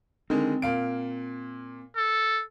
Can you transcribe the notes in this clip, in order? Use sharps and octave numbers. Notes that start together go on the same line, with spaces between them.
D3 D#3 G#3 C4
A#2 F5 D7
A4